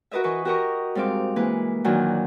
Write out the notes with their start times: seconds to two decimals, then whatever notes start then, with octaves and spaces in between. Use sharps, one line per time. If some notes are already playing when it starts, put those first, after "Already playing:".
0.11 F#4 A#4 B4 D#5 E5
0.24 E3 B4 D#5 C#6
0.45 F#4 G4 A#4 D#5 A#5 C#6
0.95 G#2 G3 C4 F5 D6
1.36 E3 G#3 A#3 E4 B4
1.84 A#2 D#3 E3 F#3 D4 F#4